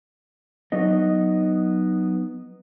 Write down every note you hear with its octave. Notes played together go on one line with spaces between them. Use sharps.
F#3 B3 D#4 D#5